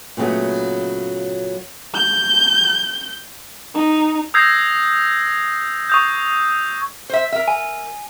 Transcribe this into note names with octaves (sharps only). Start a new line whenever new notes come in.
A#2 C#3 F#3 A3 B3
G6
D#4
D#6 E6 G6 G#6 A#6 C7
C#6 D#6 G6
C5 E5
A#4 E5
G#5